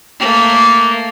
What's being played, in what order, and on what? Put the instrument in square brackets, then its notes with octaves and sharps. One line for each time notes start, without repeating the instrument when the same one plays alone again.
[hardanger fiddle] A3 A#3